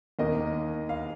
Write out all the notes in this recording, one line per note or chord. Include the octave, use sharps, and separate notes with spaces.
D#2 D#3 A#3 D#5
F5